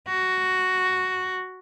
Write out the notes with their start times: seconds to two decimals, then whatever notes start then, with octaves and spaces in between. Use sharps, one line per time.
0.08 F#4